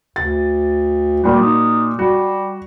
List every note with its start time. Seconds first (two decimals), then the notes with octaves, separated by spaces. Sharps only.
0.16 D2 A6
1.24 A#2 G3 F#4
1.40 D#4
1.99 G3 F#4